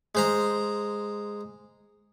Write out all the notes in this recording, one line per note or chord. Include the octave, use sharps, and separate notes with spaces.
G#3 C5 A#5